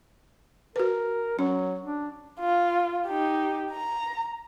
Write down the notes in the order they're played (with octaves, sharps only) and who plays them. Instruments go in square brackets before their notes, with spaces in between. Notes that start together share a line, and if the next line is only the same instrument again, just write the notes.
[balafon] F#4 B4 [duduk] A#4
[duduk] F#3 [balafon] C#4
[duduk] D4
[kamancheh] F4
D#4 G4
A#5